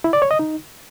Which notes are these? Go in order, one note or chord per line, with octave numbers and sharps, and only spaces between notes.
E4
D5
C#5
D#5
D#4